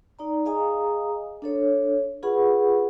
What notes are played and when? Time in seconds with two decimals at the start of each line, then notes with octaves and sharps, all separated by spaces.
0.19 D#4 D5 A#5
0.45 G#4 D#5 F5 G#5 A#5 D#6
1.42 D4 A4 C#5
2.23 F4 G#4 B4 F#5 B5 C#6